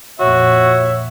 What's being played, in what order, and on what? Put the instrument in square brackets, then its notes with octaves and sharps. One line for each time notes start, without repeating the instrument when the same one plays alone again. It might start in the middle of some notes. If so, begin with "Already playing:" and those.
[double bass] F2 A#2 [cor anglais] F#4 [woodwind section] C#5 E5